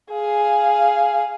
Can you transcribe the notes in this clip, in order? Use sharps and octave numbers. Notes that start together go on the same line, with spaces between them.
G#4 F5